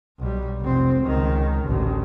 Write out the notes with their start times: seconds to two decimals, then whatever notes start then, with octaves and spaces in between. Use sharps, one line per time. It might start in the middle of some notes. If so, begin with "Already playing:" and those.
0.19 B1 G3
0.61 F1 C4
1.01 C#2 D#3
1.64 A1 D2